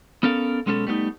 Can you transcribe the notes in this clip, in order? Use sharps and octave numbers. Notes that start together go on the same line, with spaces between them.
B3 C#4 A4 A#4 F5
B1 G#3 B3 C#4 G#4 A4
G3 A3 B3 C#4 D#4